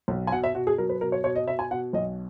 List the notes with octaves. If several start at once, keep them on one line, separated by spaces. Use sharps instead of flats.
B1
G#5
B2 F#5
E5
B2 F#4
G#4
F#3 A#4
B4
B2 A#4
C#5
B2 C#5
D#5
B2 E5
G#5
B2 F#5
B1 D#5